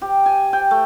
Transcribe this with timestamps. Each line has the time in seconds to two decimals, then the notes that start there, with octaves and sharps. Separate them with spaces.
0.02 G4
0.26 G#5
0.53 G5
0.71 A3